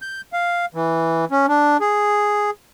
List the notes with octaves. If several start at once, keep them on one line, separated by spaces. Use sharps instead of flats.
G6
F5
E3
C#4
D4
G#4